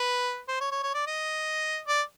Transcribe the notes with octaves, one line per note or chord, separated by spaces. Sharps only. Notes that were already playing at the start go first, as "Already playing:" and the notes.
Already playing: B4
C5
C#5
C#5
C#5
D5
D#5
D5